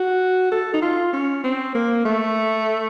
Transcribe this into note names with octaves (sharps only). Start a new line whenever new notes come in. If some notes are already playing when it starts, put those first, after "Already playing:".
Already playing: F#4
A4
D#4
F4
C#4
C4
A#3
A3